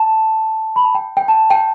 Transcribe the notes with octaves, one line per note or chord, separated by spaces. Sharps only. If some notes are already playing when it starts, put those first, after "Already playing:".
Already playing: A5
B5
A5
G5
G5
A5
G5